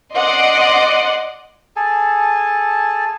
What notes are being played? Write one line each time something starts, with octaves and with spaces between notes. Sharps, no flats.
D5 D#5 F#5 C6 D6
G#4 A4 G#5 A5